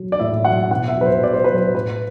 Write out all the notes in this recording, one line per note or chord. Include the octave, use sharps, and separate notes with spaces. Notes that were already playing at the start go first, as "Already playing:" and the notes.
Already playing: F#3
D5
A2 E5
F#3 F#5
B2 F#5
E5
F#3 B4
C5
B2 D5
C5
F#3 B4
C5
A2 B4